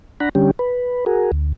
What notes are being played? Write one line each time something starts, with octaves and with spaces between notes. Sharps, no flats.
D4 F#5 A#5 B5
D3 G3 C#4 G4
B4
F#4 G#4 A#4
D2